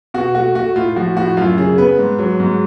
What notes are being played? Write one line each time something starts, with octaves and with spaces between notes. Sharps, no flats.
B2 F#4
A3 F#4
A3 F#4
A2 F4
F3 F#4
A2 F#4
F#2 F4
C#3 G#4
B3 B4
G#2
F#3
G#2